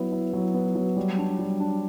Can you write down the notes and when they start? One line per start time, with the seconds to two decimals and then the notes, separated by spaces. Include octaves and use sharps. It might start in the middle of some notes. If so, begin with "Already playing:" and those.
Already playing: F#3 B3 E4
0.12 E4
0.33 F#3
0.54 B3
0.75 F#3
0.96 G3
1.18 D4
1.39 G3
1.60 D4